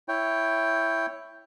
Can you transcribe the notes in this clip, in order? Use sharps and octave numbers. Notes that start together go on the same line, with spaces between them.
E4 C#5 G5